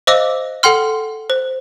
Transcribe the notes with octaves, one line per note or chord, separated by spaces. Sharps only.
C5 D#5 F5 D6 E6 A#6
A4 F#5 G5 C6 F6
C5